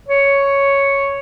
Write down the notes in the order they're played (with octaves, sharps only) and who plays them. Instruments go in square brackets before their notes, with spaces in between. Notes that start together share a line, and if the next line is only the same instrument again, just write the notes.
[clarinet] C#5